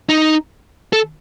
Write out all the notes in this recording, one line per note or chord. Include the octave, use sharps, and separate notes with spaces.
D#4
A4